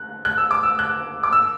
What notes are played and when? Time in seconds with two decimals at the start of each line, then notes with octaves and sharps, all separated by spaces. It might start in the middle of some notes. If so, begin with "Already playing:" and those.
Already playing: F#6
0.25 F#6
0.38 E6
0.51 D6
0.63 E6
0.79 F#6
1.23 D6
1.32 E6